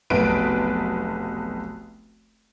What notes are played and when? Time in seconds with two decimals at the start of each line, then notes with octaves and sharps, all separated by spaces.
0.10 F1 B1 B3 B4 D7